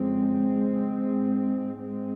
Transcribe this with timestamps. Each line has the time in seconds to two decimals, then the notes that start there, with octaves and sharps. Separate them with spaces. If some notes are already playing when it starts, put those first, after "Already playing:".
Already playing: F2 C#3 G#3 C4
1.04 G#2
1.79 G#3 C4